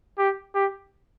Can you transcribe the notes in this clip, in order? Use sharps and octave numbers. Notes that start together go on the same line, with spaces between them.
G4
G4